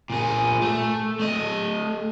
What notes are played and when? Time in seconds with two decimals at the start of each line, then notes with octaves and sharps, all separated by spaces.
0.10 A#2 G#4
0.62 A3
1.20 A3 D#5